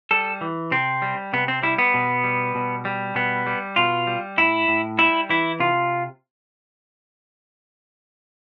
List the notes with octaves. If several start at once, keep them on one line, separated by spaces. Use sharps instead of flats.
G3 A4
E3
C3 C4
G3
C3 B3
C4
G3 E4
B3
B2
G3
B2
G3
B2 B3
G3
B2 F4
G3
A2 E4
A2
G3 E4
E3 E4
C3 F4